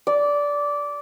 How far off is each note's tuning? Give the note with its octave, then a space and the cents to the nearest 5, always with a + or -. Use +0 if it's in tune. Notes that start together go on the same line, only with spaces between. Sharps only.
D5 -15